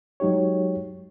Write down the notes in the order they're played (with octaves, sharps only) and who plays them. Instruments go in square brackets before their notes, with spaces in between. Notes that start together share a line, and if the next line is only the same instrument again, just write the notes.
[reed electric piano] F#3 G#3 D#4 G4 C#5